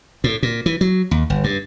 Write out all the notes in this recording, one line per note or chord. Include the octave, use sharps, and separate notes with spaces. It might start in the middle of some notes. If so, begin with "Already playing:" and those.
A2
A#2
E3
F#3
D#2
G1
G2